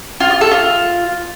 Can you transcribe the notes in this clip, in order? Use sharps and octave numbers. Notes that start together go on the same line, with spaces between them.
F4
F4
A4
F4